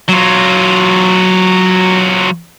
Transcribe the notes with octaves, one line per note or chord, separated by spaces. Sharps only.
F#3 F4